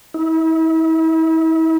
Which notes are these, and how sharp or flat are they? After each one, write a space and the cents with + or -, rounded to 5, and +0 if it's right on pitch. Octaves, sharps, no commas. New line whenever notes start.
E4 -40